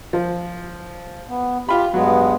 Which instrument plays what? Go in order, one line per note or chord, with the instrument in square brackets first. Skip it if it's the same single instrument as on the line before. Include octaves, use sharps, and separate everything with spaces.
[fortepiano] F3
[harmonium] B3
[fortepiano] F4 B5 [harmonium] G4
[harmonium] G2 G#3 B3 [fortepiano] F#3